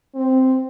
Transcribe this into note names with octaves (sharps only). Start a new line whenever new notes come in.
C4